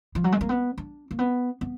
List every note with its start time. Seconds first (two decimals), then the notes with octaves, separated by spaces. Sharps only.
0.15 F3
0.24 F#3
0.32 G#3
0.41 A#3
0.49 B3
0.78 D4
1.11 A#3
1.19 B3
1.61 B3